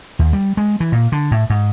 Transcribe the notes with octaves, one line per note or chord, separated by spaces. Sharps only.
D#2
G3
G#3
E3
A#2
D3
A2
G#2